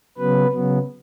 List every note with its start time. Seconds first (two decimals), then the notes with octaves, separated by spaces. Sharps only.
0.18 C#3 F#3 B3 B4
0.52 C#3 F#3 B3